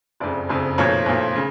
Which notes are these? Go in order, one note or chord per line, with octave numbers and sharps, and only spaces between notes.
F#1 F2 C#3 D5
F#1 F2 C#3
B1 A#2 F3 A3 C#5
B1 A#2 F3 A3
C#3